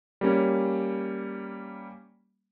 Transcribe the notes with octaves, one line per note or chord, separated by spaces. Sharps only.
G3 A#3 C#4